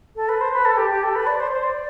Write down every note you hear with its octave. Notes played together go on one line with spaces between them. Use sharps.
A4
B4
C5
B4
A4
G4
G4
A4
B4
D5
C5
C5
D5